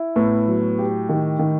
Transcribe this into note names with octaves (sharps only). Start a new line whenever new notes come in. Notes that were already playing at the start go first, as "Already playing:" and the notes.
Already playing: E4
A2 B3
F#3
G4
D#3
D#3